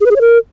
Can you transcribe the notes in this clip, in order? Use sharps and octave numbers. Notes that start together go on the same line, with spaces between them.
G#4
B4
G#4
C#5
A#4